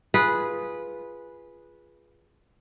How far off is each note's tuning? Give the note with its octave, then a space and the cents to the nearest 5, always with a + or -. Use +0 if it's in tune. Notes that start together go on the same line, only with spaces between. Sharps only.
F4 -5 G#4 +0 B4 -10